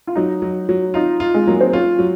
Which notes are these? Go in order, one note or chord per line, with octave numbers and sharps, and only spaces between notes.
F4
F#3 D#4
F#3
F#3
D#4 F4
F4
G#3
F#3 A#3
C4
C#4 F4
F#3